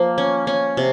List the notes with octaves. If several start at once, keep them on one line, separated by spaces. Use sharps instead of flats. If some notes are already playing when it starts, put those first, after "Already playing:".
Already playing: F3 A#3
C#4
C#4
C3